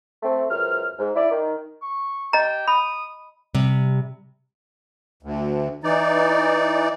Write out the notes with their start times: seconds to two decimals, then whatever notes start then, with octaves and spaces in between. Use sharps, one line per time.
0.22 A3 C4
0.49 C#2 F#2 C5 F6
0.98 G#2
1.15 E4 D5
1.30 D#3
1.82 C#6
2.33 G4 D#5 A#5
2.68 B5 D#6
3.55 C3 G3
5.23 D2
5.84 E3 D#4 D5